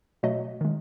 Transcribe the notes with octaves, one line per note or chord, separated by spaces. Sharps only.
B2 F#3 A3 D#5
D#3 G#3